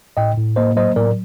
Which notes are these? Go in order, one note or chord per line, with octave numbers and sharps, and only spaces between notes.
A2 D#5 G5
A2
A#3 C5 D#5
F#3 C5 D#5
A2 A#4 D5